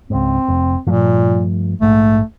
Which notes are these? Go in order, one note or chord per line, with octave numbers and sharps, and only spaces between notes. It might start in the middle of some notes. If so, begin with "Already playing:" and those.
C#2 G#2 C4
F1
G2 A#2 F3 A3
A#1 G#2 A3